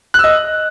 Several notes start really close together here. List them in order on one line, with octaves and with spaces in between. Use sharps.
F#6 E6 D#5